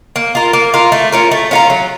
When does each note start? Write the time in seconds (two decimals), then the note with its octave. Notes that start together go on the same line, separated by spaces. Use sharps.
0.16 A#3
0.35 F4 A#4
0.53 A#3
0.74 F4 A#4
0.92 A3
1.12 C#4 F4 A#4
1.31 A3
1.51 C#4 F4 A#4
1.70 F#3